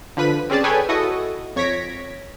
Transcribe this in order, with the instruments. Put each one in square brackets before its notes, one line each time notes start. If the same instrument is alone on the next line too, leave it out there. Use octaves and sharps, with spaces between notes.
[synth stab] D3 F3 B4 B6 D#7
C4 C#4 G#4 D5 A5
G#4 A4 B4 C#5 G5 G#5
E4 F#4 A4 D#5 C#6 D#6
F2 C#5 G#6 A#6 B6 D7